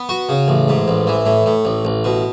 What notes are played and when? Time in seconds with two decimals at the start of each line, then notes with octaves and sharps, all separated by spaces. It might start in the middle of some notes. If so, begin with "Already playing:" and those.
Already playing: B3
0.09 F#4
0.29 C#3
0.48 A1
0.68 G#2
0.88 A1
1.07 E3
1.26 A2
1.46 A2
1.65 A1
1.85 A1
2.04 B2